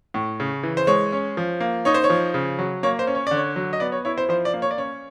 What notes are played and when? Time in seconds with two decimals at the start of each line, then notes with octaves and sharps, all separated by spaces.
0.14 A2
0.40 C#3
0.63 E3
0.77 C5
0.87 G#3 C#5
1.12 C#4
1.37 F3
1.60 A#3
1.85 D#4 C#5
1.94 C5
2.04 C#5
2.10 F3
2.34 C#3
2.59 F#3
2.83 A#3 C#5
2.99 C5
3.07 C#4
3.15 C#5
3.27 D3 D5
3.37 C#5
3.56 F#3
3.73 D#5
3.80 B3 D5
3.92 C#5
4.05 E4 C#5
4.18 C5
4.29 F3 C5
4.45 D5
4.54 A#3
4.62 C#5
4.71 D5
4.77 C#4 C#5